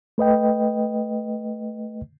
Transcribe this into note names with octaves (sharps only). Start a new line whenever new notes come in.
A3 B4 D#5 G5